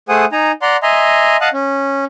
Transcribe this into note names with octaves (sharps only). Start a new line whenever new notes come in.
A3 G#4 C5 F#5 G#5 D#6
D#4 G#5 A#5
D5 F#5 A#5 C6
D#5 E5 G#5 A#5 C6
D#5 F5 F#5 A5 D#6 F#6
C#4